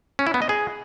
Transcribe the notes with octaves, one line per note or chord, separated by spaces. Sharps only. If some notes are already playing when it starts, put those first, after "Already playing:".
C#4
E4
B3
D#5
G#4